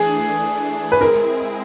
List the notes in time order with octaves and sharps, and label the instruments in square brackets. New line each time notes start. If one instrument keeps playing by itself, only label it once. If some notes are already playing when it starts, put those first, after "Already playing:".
Already playing: [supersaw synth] E3 A3 D4 [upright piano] G#4
[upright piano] B4
[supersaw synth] G#3 C4 E4 G#4 [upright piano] A#4